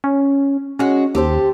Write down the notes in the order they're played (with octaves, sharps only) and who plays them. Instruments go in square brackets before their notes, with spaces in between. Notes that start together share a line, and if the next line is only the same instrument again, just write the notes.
[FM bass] C#4
[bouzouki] G#3 F#4 [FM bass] C#4
[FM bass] D#2 [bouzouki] G4 A4 C5